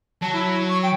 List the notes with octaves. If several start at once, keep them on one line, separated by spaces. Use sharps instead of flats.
F#3 A5
E4
C#6
G5